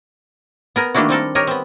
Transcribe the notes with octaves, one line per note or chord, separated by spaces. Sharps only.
B3 A#4 G#5
D#3 A3 A#3 D4 E4 F#4
G3 C4 A4 A#4
G4 A#4 C#5 D#5
B3 C4